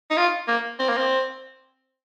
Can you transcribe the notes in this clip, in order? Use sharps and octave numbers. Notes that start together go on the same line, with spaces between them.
D#4
F4
A#3
C4
A#3
C4